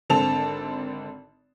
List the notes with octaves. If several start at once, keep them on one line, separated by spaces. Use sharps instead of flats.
G#1 D3 C4 A5 F7